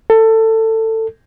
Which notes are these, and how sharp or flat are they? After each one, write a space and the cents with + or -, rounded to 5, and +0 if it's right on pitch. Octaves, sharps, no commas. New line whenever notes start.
A4 +20